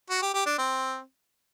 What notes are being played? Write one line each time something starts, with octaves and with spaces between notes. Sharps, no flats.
F#4
G4
G4
D4
C4